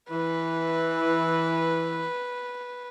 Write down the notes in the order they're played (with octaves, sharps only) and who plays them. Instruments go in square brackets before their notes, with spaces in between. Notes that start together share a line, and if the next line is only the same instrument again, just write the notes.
[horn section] E3 [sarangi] B4